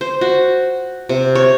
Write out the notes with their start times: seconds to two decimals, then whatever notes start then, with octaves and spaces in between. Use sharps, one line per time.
0.01 C5
0.21 F#4
1.09 C3
1.35 C#5